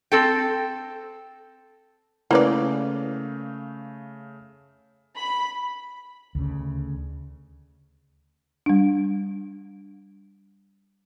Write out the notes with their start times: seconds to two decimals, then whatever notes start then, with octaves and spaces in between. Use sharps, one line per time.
0.12 C4 A4 G5
2.31 C#3 A3 A#3 C#4 E4 B4 D5 F5
5.17 B5
6.35 D2 C#3
8.66 G3 D4